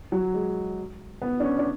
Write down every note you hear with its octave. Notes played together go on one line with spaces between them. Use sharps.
F#3
G#3
B3
D4
C#4
D4